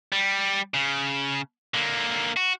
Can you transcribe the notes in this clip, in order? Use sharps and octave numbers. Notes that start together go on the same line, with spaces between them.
G3
C#3
D3 A#3
F#4